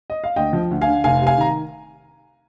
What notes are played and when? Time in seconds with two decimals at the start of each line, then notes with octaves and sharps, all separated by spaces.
0.10 D#5
0.24 F5
0.36 D2 D#5 G5
0.53 F3
0.71 D2
0.81 F5 G#5
0.87 D3
1.04 F1 F5 G#5
1.21 C3
1.27 F5 G#5
1.38 D#3 A#5